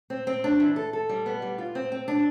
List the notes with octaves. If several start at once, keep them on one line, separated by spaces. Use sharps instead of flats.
C4
C4
D4
E3
A4
A4
G3
B3
G3
F4
C4
C4
D4